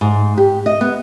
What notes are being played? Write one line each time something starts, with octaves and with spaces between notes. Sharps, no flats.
G#2
G4
D#5
B3